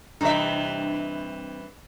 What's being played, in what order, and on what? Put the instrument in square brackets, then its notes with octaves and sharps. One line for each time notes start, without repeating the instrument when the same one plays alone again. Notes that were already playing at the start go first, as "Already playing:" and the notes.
[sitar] G2 E3 E5 [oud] C3 D#4